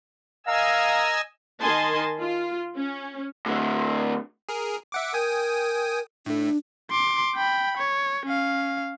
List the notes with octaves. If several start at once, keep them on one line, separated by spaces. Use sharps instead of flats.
A#4 D#5 F5 G#5 A#5 E6
D#3 D#5 G#5 A5 C6
F4
C#4
A2 D3
G#4 A#4
E5 F#5 D6
A#4 G5 G#5 D#6
A2 A3 D4
C6 D6
G5 B5
C#5
C#4 F5